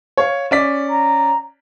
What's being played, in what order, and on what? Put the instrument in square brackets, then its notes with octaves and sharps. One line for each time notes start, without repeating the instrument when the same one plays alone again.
[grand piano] C#5 F5
C#4 D5 B6
[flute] A#5